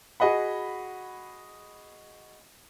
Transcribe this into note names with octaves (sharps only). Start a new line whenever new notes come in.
F#4 G#4 D#5 F#5 B5